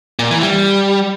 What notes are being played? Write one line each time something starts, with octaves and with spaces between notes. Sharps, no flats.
A#2
E3
G3